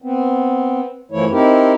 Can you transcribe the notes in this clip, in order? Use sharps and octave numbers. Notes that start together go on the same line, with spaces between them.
B3 C4
F#2 E3 F3 A3 E4 C#5
C4 D#4 E4 G4 A#4